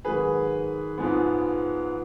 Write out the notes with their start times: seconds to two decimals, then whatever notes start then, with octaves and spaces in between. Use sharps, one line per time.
0.05 G#2 D#3 F#3 G#4 B4
0.98 G#2 F3 G#3 B3